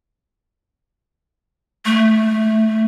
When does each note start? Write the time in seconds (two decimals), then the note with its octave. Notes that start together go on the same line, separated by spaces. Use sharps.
1.86 A3